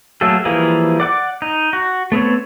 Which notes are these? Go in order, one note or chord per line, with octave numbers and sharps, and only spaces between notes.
F#3 A3 A#3 G#4 A4
E3 F3 G3 A#3 G#4
D5 F#5 D6
D#4
F#4
A3 B3 C4 C#5